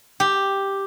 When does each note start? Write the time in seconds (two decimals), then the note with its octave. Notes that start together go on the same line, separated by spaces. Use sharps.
0.20 G4